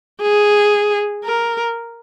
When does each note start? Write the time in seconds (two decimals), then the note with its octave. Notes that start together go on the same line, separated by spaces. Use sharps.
0.22 G#4
1.24 A#4